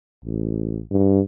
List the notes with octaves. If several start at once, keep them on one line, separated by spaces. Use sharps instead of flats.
A1
G2